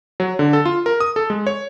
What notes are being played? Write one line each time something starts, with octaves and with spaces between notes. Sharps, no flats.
F#3
D3
A4
F4
A#4
D#6
A4
G#3
C#5